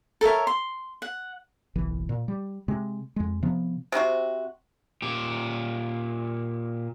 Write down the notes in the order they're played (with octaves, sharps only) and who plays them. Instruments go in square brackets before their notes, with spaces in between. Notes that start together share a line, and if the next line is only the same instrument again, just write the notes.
[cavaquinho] A4 A#4 C#5 E5
C6
F#5
[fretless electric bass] F#1 B1 E3
A#2
G3
C3 G#3
F2 G#3
C3 F3 B3
[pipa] C3 C4 E4 F#4
[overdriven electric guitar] A#2 G4